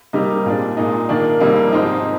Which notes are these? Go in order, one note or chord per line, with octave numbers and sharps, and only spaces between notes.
C3 G3 A#3 D#4
A#2 G#3 D4
A#2 G#3 D#4
D#3 A#3 D4
F2 C3 G3 A#3 D#4
G#2 F3 C4 D#4